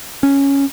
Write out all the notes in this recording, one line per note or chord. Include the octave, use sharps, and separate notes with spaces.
C#4